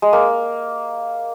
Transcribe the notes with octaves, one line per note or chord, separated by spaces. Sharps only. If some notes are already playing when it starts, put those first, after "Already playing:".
G#3
A#3